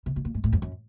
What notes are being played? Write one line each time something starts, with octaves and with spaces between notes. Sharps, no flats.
C3
B2
A#2
G#2
A2
F2
F#2